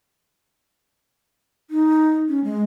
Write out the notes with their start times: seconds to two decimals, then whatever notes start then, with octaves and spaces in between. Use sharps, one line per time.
1.70 D#4
2.28 C#4
2.44 G#3